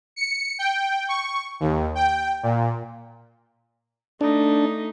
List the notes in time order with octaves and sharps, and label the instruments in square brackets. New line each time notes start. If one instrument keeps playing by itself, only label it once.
[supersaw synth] C#7
G5
C#6
D#2
G5
A#2
[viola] A3 D#4 [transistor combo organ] D4